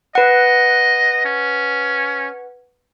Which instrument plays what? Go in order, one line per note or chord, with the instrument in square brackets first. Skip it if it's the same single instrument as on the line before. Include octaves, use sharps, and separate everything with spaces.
[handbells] B4 F#5 [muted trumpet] D#5
[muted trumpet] C#4